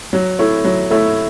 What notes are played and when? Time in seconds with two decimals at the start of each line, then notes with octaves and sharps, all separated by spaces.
0.13 F#3
0.39 A3 E4 C#5
0.64 F#3
0.90 A3 E4 C#5